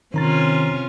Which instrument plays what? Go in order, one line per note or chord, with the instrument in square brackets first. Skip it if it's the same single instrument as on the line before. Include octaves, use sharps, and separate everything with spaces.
[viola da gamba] C3 C#4 F4 [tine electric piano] D#3 A#5 A6